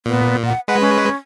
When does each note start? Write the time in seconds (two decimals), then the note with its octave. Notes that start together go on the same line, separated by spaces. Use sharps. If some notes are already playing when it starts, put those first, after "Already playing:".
0.06 A#2 B3
0.45 F#5
0.68 G#3 B4 F#5
0.80 C#4